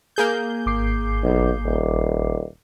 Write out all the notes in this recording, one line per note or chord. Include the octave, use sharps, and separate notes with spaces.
A#3 G#4 G6
G#1 D6 C7
B1
D#1